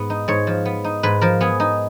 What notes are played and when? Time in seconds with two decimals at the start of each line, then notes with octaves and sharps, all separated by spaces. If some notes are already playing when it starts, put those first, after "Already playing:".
Already playing: G#2 B3
0.10 D#4
0.28 G#2 C#5
0.47 F3
0.65 B3
0.85 D#4
1.03 G#2 B4
1.21 F3 A#4
1.41 B3 G#4
1.60 D#4